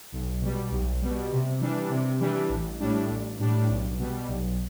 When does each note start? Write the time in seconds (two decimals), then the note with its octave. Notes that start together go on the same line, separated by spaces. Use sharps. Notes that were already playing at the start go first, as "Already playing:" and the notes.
0.12 B1
0.41 B2 G3
0.71 B1
1.01 B2 G3
1.31 C3
1.60 E3 G3 D4
1.90 C3
2.20 E3 G3 D4
2.49 A1
2.80 A2 G3 D4
3.09 A1
3.39 A2 G3 D4
3.69 B1
3.99 B2 G3
4.28 B1